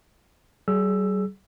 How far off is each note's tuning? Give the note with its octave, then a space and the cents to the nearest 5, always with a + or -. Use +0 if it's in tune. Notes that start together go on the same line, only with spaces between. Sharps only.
G3 -40 G#4 +20 E6 +10